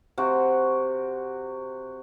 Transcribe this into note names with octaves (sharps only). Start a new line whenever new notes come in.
C3 F#4